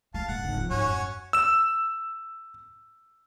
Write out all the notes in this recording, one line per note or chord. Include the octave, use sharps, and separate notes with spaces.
G#3 F5 A5
A#1 G2 F#5
G#1 C#3
F3
G#2 C#4 F#4 C#5
F#2
E6 E7